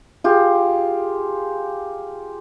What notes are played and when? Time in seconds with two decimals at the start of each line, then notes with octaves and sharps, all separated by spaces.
0.24 F4 G4 G#4